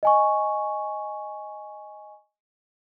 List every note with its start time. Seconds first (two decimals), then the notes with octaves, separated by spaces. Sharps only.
0.03 D#5 G#5 C#6